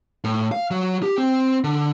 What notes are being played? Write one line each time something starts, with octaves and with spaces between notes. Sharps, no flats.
A2
F5
F#3
G4
C4
D3